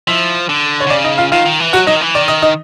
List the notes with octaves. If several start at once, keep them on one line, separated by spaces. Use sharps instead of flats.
F3 E4 E5
D3
C#5
D3
C#3 D5
D#4 D#5
F4 F5
D#3 F4 F5
D#3
E3
F#3 F#4 F#5
F#3 D#4 D#5
D#3
E3
D#3 D5
D#4 D#5
D#4 D#5